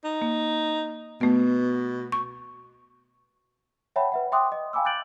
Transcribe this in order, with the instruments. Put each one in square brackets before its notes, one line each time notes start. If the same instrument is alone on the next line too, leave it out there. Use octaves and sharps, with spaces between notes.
[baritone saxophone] D#4
[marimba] A#3
[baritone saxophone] B2 [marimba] A3 B3
[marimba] C#6
[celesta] C#5 E5 F#5 G5 A5 B5
B4 E5 F#5
E5 G5 C6 D6 D#6 F#6
D#5
F5 G5 G#5 B5 D6 E6
D6 F#6 G6 A6 D7 F#7